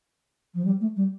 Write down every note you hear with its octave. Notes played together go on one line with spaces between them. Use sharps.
F3
G3
A3
G3